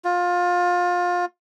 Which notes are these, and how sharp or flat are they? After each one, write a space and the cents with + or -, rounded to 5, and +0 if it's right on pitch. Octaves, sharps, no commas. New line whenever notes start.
F4 +25